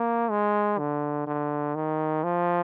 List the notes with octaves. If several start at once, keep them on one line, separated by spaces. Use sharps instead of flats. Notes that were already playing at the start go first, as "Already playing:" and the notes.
Already playing: A#3
G#3
D3
D3
D#3
F3